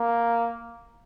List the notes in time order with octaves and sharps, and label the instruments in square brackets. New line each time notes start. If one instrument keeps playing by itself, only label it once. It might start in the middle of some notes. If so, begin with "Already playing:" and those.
Already playing: [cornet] A#3